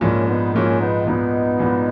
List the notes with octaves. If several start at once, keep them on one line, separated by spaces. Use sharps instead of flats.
A#1 G#2 F3 A#3 C#4
B3 D#4
A#1 G#2 F3 A#3 C#4
B3 D#4
A#1 G#2 F3 B3 D#4
A#1 G#2 F3